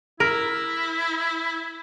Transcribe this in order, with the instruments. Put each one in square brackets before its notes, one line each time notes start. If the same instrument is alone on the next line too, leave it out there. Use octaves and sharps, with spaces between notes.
[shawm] E4 [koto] A#4